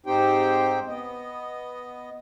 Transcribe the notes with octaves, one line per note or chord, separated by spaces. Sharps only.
G#2 C4 D#4 G4 C5 G5
B3 D#5